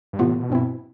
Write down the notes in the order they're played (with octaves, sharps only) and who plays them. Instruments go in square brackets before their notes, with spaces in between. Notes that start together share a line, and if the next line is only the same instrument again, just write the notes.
[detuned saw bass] G2
[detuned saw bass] A2 [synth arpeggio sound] C3 E3 B3 F4
[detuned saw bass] A2
B2
[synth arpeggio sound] G2 F3 C4 E4